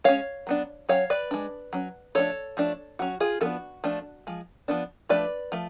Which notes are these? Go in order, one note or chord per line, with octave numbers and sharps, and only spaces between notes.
G#3 C#4 C#5 F5
F#3 B3 D4
F#3 C#4 C#5 F5
B4 D5
G#3 D4
F#3 C#4
F3 A3 D4 A4 C#5
F3 A3 D4
F#3 C#4 F#4
F4 G#4
F3 B3 D4 F#4 A4
F3 A3 D4
F3 G#3
F3 B3 D4
F3 A3 D4 B4 D5
F3 A3